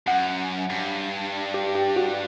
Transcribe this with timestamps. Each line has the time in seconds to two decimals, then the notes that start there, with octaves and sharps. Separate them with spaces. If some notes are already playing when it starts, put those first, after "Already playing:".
0.07 F#2 F#5
0.70 G2
1.54 G4
1.75 G4
1.96 F#4